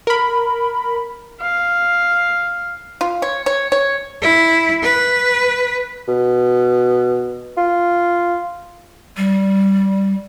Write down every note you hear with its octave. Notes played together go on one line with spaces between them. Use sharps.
A#4 B5
F5
F4
C#5
C#5
C#5
E4
B4
B2
F4
G3